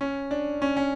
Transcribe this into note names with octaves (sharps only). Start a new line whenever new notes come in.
C#4
D4
C#4
C#4